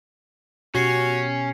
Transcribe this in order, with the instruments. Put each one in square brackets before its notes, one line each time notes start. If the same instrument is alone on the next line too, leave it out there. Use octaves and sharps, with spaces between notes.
[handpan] B2 G4 [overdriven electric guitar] C#4 [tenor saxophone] F#4 [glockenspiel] G#6 C7 C#7